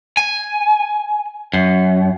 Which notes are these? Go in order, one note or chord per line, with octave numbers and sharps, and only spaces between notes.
G#5
F#2